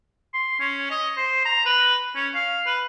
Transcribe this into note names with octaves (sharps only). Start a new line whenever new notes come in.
C6
C#4
D#5
C5
A#5
B4
C#4
F5
B4